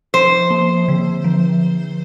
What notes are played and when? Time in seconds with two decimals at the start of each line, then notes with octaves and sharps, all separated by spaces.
0.14 F3 C5
0.50 A#3
0.88 D3
1.24 F3